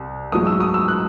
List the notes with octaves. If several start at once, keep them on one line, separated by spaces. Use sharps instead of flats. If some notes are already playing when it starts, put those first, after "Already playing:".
Already playing: C2 C3
G#2 F#3 A3 D#6
E6
D#6
E6
F#6